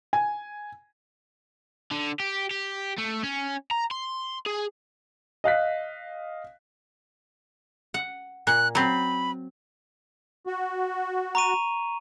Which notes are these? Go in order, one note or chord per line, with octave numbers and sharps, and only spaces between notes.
G#5
D3
G4
G4
A3
C#4
A#5
C6
G#4
D#5 F5 F#6 B6
F#5
A#2 F#6
F#3 C4 B5
F#4
A#5 C#6 D#7